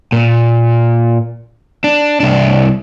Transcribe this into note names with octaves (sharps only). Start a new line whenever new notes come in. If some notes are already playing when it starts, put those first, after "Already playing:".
A#2
D4
C2 D4